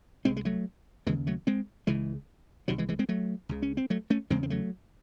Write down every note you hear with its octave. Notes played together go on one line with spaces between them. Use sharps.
C2 C3 G#3 C4
G#3
F#3 A3
D#2 C#3 E3 G#3
F#3 A3
G#3 C4
C#2 C#3 E3 G#3
C2 C3 D#3 F#3
E3 G#3
E3 G#3
G#3 C4
F#3 A3
C#2 C#3
C#4
C4
F#3 A3
A3 C#4
E2 C#3 G#3 C4
C4
F#3 A3